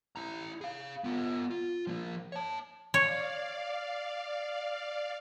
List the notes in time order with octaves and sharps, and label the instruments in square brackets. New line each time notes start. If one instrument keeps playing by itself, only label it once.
[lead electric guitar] E4 A#5
G#4 F5
B3 F4
F4
F3 A#3
C#5 A5
[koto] C#5 [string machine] D5 F5